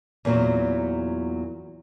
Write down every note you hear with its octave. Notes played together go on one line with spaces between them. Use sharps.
E2 A#2 E3 F#3 C4